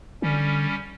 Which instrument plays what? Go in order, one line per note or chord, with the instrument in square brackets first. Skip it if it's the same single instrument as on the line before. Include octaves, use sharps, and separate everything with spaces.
[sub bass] D3 [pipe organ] G3 C#4